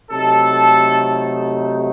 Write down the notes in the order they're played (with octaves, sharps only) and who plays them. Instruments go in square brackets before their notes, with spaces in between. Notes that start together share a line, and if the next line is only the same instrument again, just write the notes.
[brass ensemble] C3 F#3 A3 D#4 A4